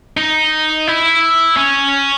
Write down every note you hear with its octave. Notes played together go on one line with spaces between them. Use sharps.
D#4
E4
C#4